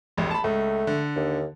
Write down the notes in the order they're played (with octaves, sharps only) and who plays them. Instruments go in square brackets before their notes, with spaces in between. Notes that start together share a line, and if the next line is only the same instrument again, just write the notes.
[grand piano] E1 A1
A5 B5
[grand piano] C#2 [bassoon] A3
[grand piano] D3
[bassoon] D#2